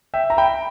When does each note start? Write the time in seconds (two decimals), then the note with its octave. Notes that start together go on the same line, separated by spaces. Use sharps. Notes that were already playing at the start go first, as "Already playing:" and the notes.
0.14 E5 G5
0.30 A#5
0.37 G5 B5